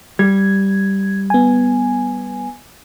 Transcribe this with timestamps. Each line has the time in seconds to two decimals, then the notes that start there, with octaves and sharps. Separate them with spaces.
0.19 G3 G#6
1.30 B3 G#5